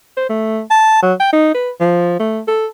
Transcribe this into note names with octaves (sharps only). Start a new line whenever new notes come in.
C5
A3
A5
F#3
G5
D#4
B4
F3
A3
A4